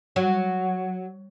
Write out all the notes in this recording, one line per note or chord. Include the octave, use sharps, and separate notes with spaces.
F#3